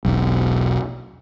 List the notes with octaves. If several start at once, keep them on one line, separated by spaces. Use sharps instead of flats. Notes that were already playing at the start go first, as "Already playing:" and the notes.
E1 B1